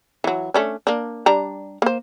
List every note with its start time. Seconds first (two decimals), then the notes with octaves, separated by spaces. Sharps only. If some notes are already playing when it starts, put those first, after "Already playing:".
0.24 E3 F#3
0.54 A3 C#4 D4
0.87 A#3 D4
1.26 G3 D4 A#5
1.82 A#3 C5